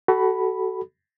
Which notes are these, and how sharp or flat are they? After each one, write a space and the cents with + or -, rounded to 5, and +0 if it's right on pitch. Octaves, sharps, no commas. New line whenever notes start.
F#4 +30 A4 -5 B5 +0